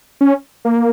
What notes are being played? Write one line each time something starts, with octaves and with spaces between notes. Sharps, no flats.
C#4
A#3